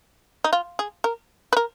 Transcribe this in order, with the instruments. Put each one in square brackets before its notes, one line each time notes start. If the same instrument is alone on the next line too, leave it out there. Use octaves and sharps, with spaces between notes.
[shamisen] D#4
F4
G#4
A#4
B4
A#4